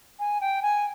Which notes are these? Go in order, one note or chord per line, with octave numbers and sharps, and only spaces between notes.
G#5
G5
G#5